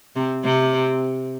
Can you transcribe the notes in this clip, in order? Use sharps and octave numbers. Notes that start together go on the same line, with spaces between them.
C3 C4
C3 C4